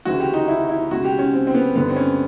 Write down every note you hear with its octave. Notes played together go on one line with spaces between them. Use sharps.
D2 C#3 E3 F#4
G4
D#4
E4
E4
C#2 B2 F#4
G4
C#4
C4
C4
B3
G2 D3 B3
C4
C#4